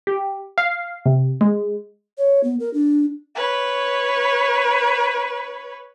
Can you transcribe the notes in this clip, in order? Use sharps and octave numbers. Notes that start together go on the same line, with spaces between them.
G4
F5
C3
G#3
C#5
B3
A#4
D4
B4 C#5